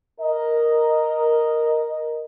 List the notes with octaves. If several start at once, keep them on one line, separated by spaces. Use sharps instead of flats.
A#4 D#5